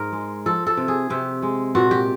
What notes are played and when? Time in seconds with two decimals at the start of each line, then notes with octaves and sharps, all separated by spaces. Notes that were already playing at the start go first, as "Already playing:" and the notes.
Already playing: G#2 A#4
0.12 G#3
0.46 F3 A4
0.67 A4
0.77 C3
0.88 G#4
1.10 C3 G4
1.42 G#3
1.75 A#2 F#4
1.91 G4